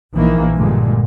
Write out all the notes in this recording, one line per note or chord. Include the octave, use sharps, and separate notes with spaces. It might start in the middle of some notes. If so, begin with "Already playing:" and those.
A#1 D#3 E3 A#3
G2 A#2 D3 G#3